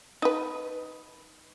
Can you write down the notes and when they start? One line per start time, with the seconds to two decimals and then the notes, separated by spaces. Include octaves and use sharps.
0.22 D#4 B4